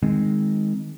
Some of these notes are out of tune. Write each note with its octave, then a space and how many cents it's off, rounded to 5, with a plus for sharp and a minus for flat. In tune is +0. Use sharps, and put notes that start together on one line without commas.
D#3 -5 G#3 -10 C4 +0